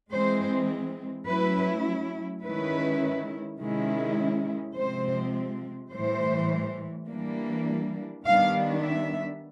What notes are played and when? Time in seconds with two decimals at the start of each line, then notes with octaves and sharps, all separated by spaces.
0.11 E3 G#3 C4 C5
1.27 F#3 A3 C#4 E4 B4
2.43 D#3 G#3 C#4 E4 B4
3.60 C3 D#3 G#3 C#4 E4
4.76 C3 F3 G#3 C4 C5
5.92 A2 E3 G3 C5
7.08 E3 G3 A#3 D4
8.25 D#3 G3 B3 D4 F5
8.83 E5